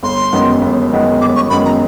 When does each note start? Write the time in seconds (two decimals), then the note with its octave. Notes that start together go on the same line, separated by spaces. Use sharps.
0.03 G1 C6
0.33 F#2 D#3 G#3 B3
0.61 G1
0.92 F#2 D#3 G#3 B3
1.21 G1 D6
1.36 C#6
1.50 F#2 D#3 G#3 B3 B5
1.65 A#5